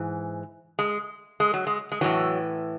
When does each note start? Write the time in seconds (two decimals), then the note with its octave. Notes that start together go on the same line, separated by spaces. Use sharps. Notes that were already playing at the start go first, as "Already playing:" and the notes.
Already playing: G#2 E3
0.79 G#3
1.40 G#3
1.54 F#3
1.67 G#3
1.92 G#3
2.01 A2 E3 F#3